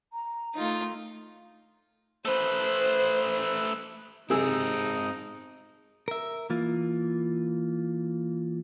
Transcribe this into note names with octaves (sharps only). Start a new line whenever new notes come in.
A#5
D#3 A3 D#4 F4
A3 B4 C5
C3 G#3 C4 D#4 G#4 E6
A#4 E5
E3 A#3 F4